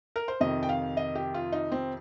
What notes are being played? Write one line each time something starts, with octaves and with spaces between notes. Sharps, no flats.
A#4
C5
F2 C3 D#3 D#5
G5
F5
D#5
G4
F4
D#4
C4